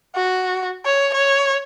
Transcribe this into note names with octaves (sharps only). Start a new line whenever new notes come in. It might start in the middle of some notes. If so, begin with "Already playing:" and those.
F#4
C#5
C#5